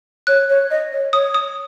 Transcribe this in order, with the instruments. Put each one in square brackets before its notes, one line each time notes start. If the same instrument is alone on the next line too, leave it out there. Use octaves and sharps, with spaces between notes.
[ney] C#5 [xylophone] F#6
[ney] C#5
D#5
C#5
[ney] C#5 [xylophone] D#6
[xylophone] D#6